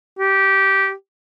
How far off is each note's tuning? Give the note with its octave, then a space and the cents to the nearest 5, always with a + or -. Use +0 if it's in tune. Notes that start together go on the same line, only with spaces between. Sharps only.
G4 -15